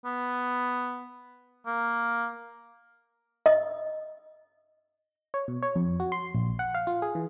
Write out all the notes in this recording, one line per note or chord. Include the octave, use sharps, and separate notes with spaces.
B3
A#3
D#5
C#5
B2
C#5
F2
F#4
C6
A#1
F#5
F5
F4
G#4
E3